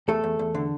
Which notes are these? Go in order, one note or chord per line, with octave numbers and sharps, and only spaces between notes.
E2 A3 A4
E2
E2
D3